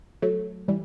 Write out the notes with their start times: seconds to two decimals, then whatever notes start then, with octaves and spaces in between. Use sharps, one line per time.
0.22 F#3 A3
0.68 E3 G3